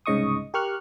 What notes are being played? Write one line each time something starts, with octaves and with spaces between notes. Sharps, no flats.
C2 G#2 C#3 D#5 C#6 D#6
G4 A#4 C#6 F6 F#6